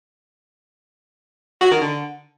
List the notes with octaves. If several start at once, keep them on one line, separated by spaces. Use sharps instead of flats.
F#4
D#3
D3